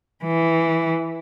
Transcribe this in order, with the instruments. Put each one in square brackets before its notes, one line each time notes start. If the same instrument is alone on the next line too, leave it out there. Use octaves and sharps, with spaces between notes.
[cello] E3